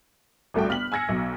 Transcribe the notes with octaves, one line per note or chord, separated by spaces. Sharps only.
G1 C2 A3 F#4 A4 G5
B3 F6 B6 F#7
G#5 E6 G#6 A#6 C#7
B1 B2